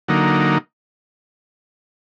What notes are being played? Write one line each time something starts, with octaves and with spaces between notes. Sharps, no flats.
D3 F#3 A#3 D#4